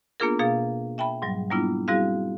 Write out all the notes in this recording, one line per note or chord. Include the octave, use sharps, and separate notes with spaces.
A#3 B3 D4 F4 G#4 A#4
B2 A#3 G#4 F5 A6
E5 G5 A5 B5
G#2 F#3 G3
G3 A#3 B3 D4 E4 F4
G3 C4 E4 F#4 G#4 F5